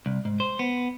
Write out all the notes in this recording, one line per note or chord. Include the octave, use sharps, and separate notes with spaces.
C2
G#2
C5
B3